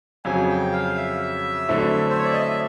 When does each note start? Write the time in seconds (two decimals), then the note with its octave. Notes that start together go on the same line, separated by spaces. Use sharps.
0.25 F2 C#3 F#3 G#5
0.49 G5
0.73 F5
0.96 E5
1.69 D3 F#3 A3 C4 E4
2.09 C5
2.17 C#5
2.25 D5
2.33 D#5
2.41 E5